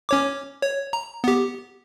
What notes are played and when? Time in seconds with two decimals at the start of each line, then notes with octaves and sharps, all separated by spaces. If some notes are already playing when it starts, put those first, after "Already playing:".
0.09 C#4 C#5 D6
0.62 C#5
0.93 A#5
1.24 B3 G4